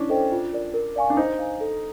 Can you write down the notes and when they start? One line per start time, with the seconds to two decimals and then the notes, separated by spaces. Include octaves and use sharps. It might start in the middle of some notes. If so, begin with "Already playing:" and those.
Already playing: C#4 D4 E4
0.09 A4 C5 D#5 G5
0.32 F4
0.53 A#4 D5
0.74 A#4
0.96 D5 F5 G#5 C#6
1.10 D4
1.17 D#4 C5
1.39 F5 G#5
1.60 A4